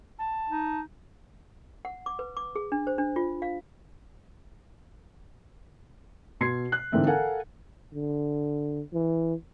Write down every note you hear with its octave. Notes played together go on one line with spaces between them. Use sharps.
A5
D#4
F#5
D6
B4
D6
G#4
D4
C5
D4
F4
F5
B2 C6 G#6 C7
F#6
G#2 D3 E3 A#3 C4 E5
A4 A#4 F5 F#5 G#5
D3
E3